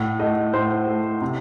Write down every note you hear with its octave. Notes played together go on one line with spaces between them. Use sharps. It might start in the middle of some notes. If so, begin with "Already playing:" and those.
Already playing: A2 F#5
A3 D#5
A2 C5
A3
C3